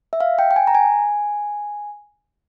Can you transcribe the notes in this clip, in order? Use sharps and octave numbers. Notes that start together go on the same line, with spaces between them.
E5
F5
G5
G5
G#5
A#5
G#5